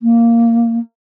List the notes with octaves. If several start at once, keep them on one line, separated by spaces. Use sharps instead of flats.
A#3